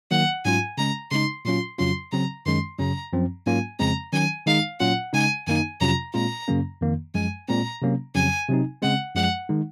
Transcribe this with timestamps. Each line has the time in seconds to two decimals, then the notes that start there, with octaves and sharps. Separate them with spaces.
0.11 D#3 F#3 A#3 F#5
0.45 G#2 F#3 C#4 F4 G#5
0.78 C#3 G#3 C#4 A#5
1.11 C#3 G#3 D#4 C6
1.45 A#2 F#3 C#4 F4 C6
1.78 F2 C#3 F#3 C#4 F4 C6
2.12 C#3 F#3 C4 A#5
2.46 F#2 D#3 G#3 C#4 C6
2.79 F#2 C#3 F#3 C#4 A#5
3.13 F#2 F3 C4
3.46 G#2 F#3 A#3 C#4 F4 G#5
3.79 F2 C#3 F3 G#3 C4 A#5
4.13 D#3 F#3 C#4 G#5
4.46 D#3 G#3 D#4 F5
4.80 A#2 F#3 C#4 F4 F#5
5.13 C#3 G#3 D#4 G#5
5.47 F#2 D#3 A#3 D#4 G#5
5.80 F2 C3 F#3 C#4 F4 A#5
6.14 A#2 G#3 C4 F4 A#5
6.48 F#2 C#3 F#3 A#3 C#4
6.81 F2 D#3 A#3
7.14 F#2 F3 G#3 G#5
7.48 A#2 G#3 C4 A#5
7.82 C3 F#3 A#3 C#4
8.15 F2 C#3 F#3 C#4 G#5
8.48 C3 F#3 C4 D#4
8.82 C#3 G#3 C4 F#5
9.15 F#2 F3 G#3 F#5
9.49 D#3 G#3 D#4